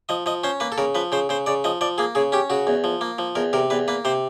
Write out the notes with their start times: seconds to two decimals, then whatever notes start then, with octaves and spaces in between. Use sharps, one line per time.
0.09 F3 D#5
0.26 F3 D#5
0.44 C#4 C5
0.60 A#3 B4
0.72 A4
0.78 C#3 A#4
0.95 F3 B4
1.12 C#3 C5
1.29 C#3 C5
1.46 C#3 D5
1.64 F3 D#5
1.81 F3 D5
1.98 A#3 G#4
2.15 C#3 G#4
2.32 C#4 G4
2.50 C#3 F#4
2.67 E2
2.84 F3
3.01 A#3
3.18 F3
3.35 E2 A#4
3.53 C3 A#4
3.70 E2 B4
3.88 A#3 B4
4.05 C3 C5